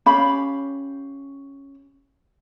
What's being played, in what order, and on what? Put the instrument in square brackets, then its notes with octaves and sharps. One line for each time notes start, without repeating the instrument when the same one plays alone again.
[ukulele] C#4 G4 F5 B5